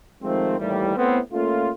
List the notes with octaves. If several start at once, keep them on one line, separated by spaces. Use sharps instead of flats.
D#3 F3 G#3 A3 C4
D#2 A2 E3 G3
A2 B3 C4
A3 A#3 C#4 F4